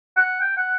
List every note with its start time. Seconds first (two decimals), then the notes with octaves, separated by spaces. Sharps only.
0.16 F#5
0.41 G5
0.57 F#5